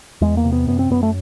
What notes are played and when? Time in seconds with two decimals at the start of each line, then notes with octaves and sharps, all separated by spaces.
0.21 E2 G#3
0.37 A#3
0.44 C3
0.52 B3
0.68 F#2 B3
0.79 C4
0.90 F#2 B3
1.03 A3